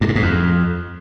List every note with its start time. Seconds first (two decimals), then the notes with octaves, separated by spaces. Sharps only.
0.01 G2
0.08 A2
0.15 G#2
0.23 F2